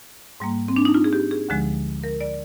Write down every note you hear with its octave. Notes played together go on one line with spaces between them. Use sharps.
G#2 G3 A#3
C4
D4
D#4
F4
G#4
G4
G#4
D2 D3 F3 G#3
A#4
D5